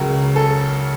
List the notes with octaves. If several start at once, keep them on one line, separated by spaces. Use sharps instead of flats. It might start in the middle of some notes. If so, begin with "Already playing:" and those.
Already playing: C#2 C#3 F#3 A#4
A4